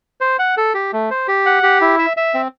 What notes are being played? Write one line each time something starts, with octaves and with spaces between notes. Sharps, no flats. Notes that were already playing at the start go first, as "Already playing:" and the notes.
C5
F#5
A4
G4
A3
C5
G4
F#5
G4
E4
E5
E5
C4